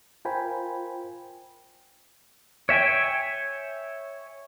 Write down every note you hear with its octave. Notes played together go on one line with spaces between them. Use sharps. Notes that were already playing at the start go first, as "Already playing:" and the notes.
F4 A#4 C5 G5 G#5 B5
C#5 E5 G5 G#5